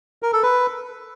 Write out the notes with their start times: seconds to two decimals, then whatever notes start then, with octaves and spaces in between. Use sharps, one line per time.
0.23 A#4
0.33 A4
0.43 B4